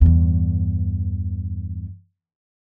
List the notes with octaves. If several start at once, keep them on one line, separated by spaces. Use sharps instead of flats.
E2 G2